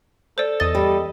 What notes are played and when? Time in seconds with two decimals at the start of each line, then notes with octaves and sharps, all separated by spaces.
0.38 A4 C5 D5
0.60 E2 D#5 A6
0.75 G3